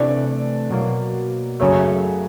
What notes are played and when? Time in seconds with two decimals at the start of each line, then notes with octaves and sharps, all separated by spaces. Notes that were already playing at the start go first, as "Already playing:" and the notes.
Already playing: C3 E3 A3 D4 D5
0.70 B2 F#3 A#3
1.60 F#2 C#3 F#3 A3 C#5